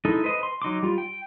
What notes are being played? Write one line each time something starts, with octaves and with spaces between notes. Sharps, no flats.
G#3 D#4 E4 A4 D#5
B4 C5 D#5
C6
F#3 D#4 C6 D6
G3 F4
G5